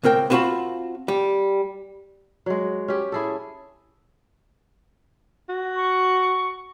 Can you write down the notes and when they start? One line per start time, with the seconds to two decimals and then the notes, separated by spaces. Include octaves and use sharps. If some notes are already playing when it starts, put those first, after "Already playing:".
0.03 C#2 C4 A#4 G5
0.30 B3 C4 F4 F#4 A5 B5
1.08 G3
2.46 F#3 G#3
2.88 C#4 G4
3.12 E4 G#4 A4
5.49 F#4
5.76 C#6